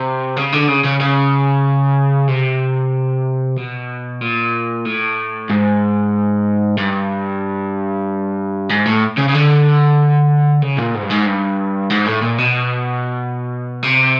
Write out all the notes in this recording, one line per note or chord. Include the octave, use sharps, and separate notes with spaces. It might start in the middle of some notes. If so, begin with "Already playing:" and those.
Already playing: C3
C#3
D3
C#3
C#3
C#3
C3
B2
A#2
A2
G#2
G2
G#2
A2
C#3
C#3
D3
C#3
A#2
G#2
G2
G#2
G2
G#2
A2
A#2
B2
C3